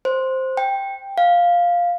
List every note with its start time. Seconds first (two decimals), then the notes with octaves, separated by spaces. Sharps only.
0.05 C5
0.57 G5
1.18 F5